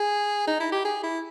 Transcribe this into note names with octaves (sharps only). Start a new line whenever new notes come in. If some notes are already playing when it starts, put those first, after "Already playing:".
Already playing: G#4
D#4
E4
G4
G#4
E4